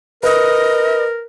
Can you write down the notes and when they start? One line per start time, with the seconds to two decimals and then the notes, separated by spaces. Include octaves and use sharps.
0.23 A#4 B4 D#5